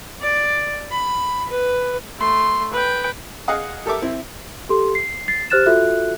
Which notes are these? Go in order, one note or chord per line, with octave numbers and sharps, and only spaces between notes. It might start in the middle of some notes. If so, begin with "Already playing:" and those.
D5
B5
B4
A3 C6
B4 G5
G#4 D#5 F5 F#5 D#6
G4 A4 A#4 E5 D6
C4 E4
G4 A4 C6
C7
A6 C7
G4 C5 F6 F#6 A6 E7
F4 F#4 A4 E5 F#6